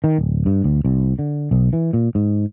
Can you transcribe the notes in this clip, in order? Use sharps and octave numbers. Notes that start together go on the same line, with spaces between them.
D#3
D1
G2
D2
C2
D3
B1
E3
A#2
G#2